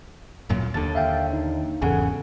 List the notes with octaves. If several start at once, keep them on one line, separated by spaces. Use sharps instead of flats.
D1 F#2 A#2
D#2 D3 A5 A6
E5 F5 G5
D#4
G#1 E2 C#3 A4 F#5 G#5